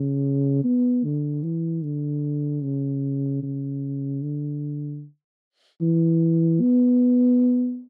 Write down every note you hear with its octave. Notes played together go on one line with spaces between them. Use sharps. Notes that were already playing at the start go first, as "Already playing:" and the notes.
Already playing: C#3
B3
D3
E3
D3
C#3
C#3
D3
E3
B3